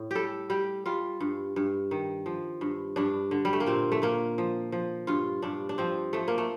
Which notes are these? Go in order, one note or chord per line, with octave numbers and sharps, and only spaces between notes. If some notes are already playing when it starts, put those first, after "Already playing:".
Already playing: A2
G3 G4 A4
G3 G4
G3 F4
G2
G2
D#3
F3
G2
G2 D4
D3
G3
A3
A#3
A#2 C4
A3
A#2 A#3
F3
F3
G2 F4
G2 D4
D4
F3 C4
F3 A3
A#3
A3